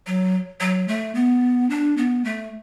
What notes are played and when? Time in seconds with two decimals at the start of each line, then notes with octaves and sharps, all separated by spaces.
0.07 F#3
0.60 F#3
0.88 A3
1.15 B3
1.70 D4
1.97 B3
2.25 A3